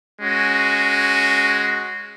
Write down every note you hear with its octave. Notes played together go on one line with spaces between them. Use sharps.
G#3 C#4 F#4